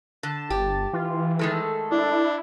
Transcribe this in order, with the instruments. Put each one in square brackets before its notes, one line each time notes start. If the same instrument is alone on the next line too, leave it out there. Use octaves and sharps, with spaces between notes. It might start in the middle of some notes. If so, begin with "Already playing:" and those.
[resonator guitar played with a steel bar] D3 [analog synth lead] A5
[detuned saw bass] G1 [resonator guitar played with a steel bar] G4
[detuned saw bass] E3 [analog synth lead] F4
[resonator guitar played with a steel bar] D#3 G#3 A3 [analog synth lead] A4
[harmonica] D4 [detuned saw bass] E4